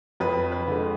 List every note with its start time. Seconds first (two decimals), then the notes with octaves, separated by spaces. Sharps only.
0.20 F2 B4
0.52 B4
0.67 D3 G#3